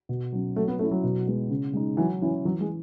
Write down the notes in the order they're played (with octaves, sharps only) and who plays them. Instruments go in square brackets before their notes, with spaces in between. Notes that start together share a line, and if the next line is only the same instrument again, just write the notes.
[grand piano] B2
F#3 C#4
[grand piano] F#3 [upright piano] A3
[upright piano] B3
[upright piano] A3 [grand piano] C#4 E4
[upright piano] F#3
[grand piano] B2
G#3 B3
C#3
G#3 D#4
[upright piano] E3 [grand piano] F#3
[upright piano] E3 [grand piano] C#4 E4
[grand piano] E3 [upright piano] F#3
[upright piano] G#3